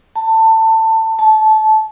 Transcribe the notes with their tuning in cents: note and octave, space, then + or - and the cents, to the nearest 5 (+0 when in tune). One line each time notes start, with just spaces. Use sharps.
A5 +20
A5 -20